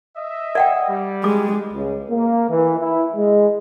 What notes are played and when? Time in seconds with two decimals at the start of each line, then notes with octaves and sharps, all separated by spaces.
0.17 D#5 E5
0.55 D5 F#5 G5
0.89 G3
1.24 G#3 D6
1.74 C#2
2.11 A#3
2.50 E3
2.80 E4
3.16 G#3